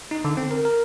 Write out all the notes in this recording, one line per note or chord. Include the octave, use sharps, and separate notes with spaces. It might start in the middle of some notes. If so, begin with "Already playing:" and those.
D#4
D3
C4
A#4
A#4